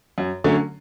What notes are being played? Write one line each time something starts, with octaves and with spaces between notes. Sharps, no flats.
F#2
D3 F#3 A3 C#4